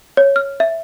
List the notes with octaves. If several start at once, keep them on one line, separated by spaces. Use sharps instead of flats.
C#5
F6
E5